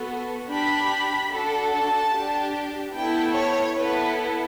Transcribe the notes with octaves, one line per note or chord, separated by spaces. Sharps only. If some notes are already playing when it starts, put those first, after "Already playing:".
Already playing: B3 F#4 A4
D4 G4 B5
D4 F#4 A4
A5
D4 G4
B3 E4 A4 G5
C#5
B3 E4 A4 B4